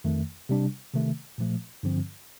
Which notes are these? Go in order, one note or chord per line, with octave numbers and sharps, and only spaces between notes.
F2 D#3 A3
C3 G3 D4
C3 D#3 A3
A#2 F3 A3
G2 D3 F3 C4